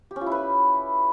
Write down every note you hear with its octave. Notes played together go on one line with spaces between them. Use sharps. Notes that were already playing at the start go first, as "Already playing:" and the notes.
G4
C#4
F4
E4
B4